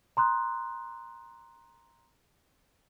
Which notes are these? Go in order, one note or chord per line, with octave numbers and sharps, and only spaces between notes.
A#5 C6 D#6 F#6